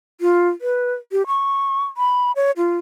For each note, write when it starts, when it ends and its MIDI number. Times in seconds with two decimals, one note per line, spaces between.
0.21 0.48 65
0.61 0.93 71
1.12 1.26 67
1.27 1.85 85
1.97 2.32 83
2.36 2.51 73
2.57 2.78 65